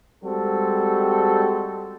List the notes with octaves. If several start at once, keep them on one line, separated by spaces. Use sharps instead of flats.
G3 G#3 C4 F#4 A4